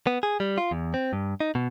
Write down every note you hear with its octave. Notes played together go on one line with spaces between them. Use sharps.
B3
G#4
G3
F4
E2
C4
G2
D#4
B2